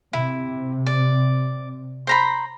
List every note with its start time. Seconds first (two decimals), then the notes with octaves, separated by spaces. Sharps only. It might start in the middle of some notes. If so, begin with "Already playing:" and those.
0.13 C3 E4
0.86 D5
2.07 C5 A#5 B5